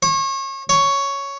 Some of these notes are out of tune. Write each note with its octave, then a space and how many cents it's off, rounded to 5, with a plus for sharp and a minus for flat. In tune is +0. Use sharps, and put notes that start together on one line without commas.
C#5 -35
C#5 +5